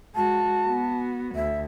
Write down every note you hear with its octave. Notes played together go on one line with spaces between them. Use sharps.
G#3 F#4 A5
B3 F#4
D2 E5